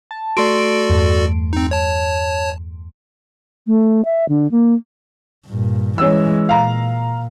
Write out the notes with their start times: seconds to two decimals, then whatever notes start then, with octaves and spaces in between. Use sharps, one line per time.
0.11 A5
0.37 A3 F#4 A4 D5 C6 D7
0.90 E2 G2
1.53 C4 D#4
1.71 C#5 A5
3.67 A3
4.05 E5
4.29 D3
4.51 A#3
5.47 G2 A#2
5.98 E3 G#3 C#4 E6
6.49 A#2 F5 A#5